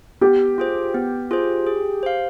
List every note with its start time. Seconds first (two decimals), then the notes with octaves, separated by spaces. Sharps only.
0.21 B3 G4
0.58 F4 G#4 C5
0.94 B3
1.31 F4 G#4 C5
1.67 G#4
2.03 C5 F5